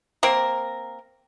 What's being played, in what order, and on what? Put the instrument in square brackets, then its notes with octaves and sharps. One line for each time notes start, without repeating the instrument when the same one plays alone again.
[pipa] A#3 C4 A#4